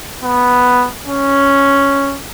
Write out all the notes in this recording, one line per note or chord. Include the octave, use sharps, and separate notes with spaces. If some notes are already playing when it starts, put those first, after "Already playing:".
B3
C#4